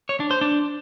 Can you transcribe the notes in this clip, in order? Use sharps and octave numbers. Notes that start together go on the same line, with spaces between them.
C#5
D4
C5
D4